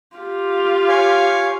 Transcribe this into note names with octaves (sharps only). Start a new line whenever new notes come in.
F4 G4
C#5 F5 G#5